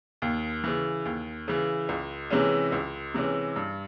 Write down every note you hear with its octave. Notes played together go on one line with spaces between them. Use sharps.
D#2
C#3 E3
D#2
C#3 E3
C#2
C3 E3 G#3 C#4
C#2
C3 E3 G#3 C#4
G2